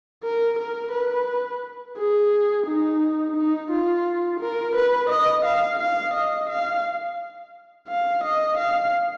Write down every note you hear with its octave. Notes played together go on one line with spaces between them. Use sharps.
A#4
A#4
B4
G#4
D#4
D#4
F4
A#4
B4
D#5
F5
F5
D#5
F5
F5
D#5
F5